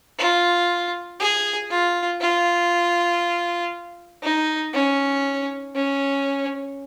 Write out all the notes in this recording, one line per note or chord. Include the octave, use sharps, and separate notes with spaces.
F4
G#4
F4
F4
D#4
C#4
C#4